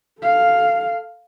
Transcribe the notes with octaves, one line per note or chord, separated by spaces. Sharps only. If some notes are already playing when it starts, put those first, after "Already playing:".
A4 F5